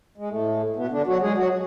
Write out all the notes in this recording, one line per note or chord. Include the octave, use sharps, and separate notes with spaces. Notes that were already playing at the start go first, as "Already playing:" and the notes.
G#3
A2 A3
B2 B3
D3 D4
F#3 F#4
G#3 G#4
F#3 F#4